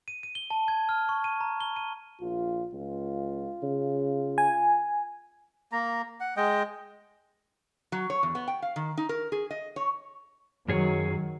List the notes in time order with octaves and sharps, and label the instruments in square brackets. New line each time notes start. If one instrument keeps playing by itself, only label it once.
[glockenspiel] D#7
D#7
G7
A5
G#6
F6
C#6
D#7
A#5
G7
D#7
[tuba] A#1 [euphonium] F4
[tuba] C#2 [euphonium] F4
[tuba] C#3
[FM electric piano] G#5
[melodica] A#3 A#5
F#5
G#3 D#5 G5
[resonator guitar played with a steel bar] F#3
C#5
E2
B3
G5
F5
D#3
D#4
A#4
G#4
D#5
C#5
[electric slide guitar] F#2 G#4 C#5 [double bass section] D#3 F#3